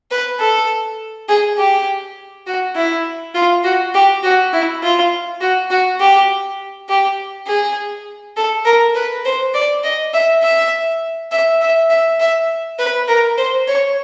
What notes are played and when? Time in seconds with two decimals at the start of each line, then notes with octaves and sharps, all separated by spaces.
0.11 B4
0.40 A4
1.29 G#4
1.58 G4
2.47 F#4
2.76 E4
3.35 F4
3.64 F#4
3.94 G4
4.23 F#4
4.53 E4
4.83 F4
5.41 F#4
5.70 F#4
6.00 G4
6.89 G4
7.47 G#4
8.37 A4
8.65 A#4
8.95 B4
9.25 C5
9.54 D5
9.84 D#5
10.13 E5
10.43 E5
11.31 E5
11.61 E5
11.90 E5
12.20 E5
12.79 B4
13.08 A#4
13.37 C5
13.68 C#5